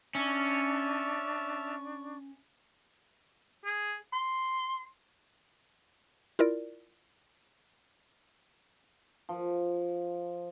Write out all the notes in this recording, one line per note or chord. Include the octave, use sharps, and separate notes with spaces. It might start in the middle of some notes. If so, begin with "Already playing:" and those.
C#4 D4 E5 A5 C#6 F6
G#4
C6
E4 F4 A#4 D5
F3